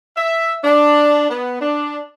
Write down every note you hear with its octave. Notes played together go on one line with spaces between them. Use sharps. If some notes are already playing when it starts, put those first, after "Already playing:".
E5
D4
B3
D4